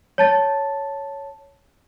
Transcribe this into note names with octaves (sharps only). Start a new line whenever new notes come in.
C#5 A5 A6